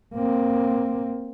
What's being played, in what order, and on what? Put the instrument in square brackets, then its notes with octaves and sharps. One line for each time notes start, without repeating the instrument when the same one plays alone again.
[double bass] A#3 C4